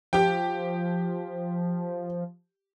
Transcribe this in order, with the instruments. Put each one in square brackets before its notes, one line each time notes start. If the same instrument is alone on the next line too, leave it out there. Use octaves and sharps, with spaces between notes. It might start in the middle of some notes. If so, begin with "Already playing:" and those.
[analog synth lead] F3 [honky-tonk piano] G4 G5